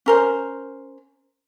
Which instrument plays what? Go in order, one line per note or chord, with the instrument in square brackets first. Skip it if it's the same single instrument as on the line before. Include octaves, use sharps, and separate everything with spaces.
[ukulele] C#4 A#4 C5